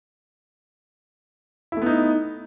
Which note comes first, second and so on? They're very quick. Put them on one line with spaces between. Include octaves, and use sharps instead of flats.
E4 A3 B3 D#4